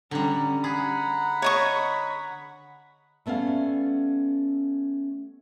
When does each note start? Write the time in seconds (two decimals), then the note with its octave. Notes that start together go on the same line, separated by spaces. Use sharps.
0.11 D3 G3 C#4 A#5
0.64 G#4 F#5 A#5 B5
1.42 C#5 D#5 C#6
3.26 G3 A3 B3 C#4 F5